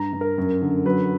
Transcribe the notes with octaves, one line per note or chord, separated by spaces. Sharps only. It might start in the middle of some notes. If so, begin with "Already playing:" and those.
Already playing: G2 A#5
G2
A#4
F#2
D3
F#3 B4